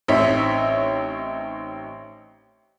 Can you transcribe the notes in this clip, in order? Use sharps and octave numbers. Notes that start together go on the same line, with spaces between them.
A1 C4 D#4 C#5 E5 B6